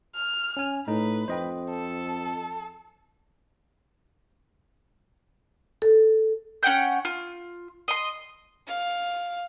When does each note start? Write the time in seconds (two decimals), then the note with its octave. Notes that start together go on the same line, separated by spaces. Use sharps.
0.15 F6
0.57 C#4 G#5
0.88 A2 D#4 B4
1.28 F2 C5 D#5 G5
1.70 A4
5.82 A4
6.63 C#4 F#5 G5 G6
7.05 F4
7.88 D#5 C6
8.67 F5